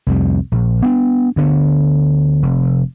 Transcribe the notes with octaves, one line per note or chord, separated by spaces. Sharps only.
C2 F2 G3
A#1
B3 C4 D4
D2 D3 B3
F1